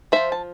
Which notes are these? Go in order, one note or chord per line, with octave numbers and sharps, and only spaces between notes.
F3 C4 C5 E5
A5